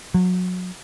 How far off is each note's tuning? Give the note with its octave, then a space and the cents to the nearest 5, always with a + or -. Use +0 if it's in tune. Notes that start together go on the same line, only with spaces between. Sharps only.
F#3 -25